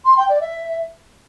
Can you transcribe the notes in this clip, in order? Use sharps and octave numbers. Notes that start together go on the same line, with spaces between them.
C6
G5
D5
E5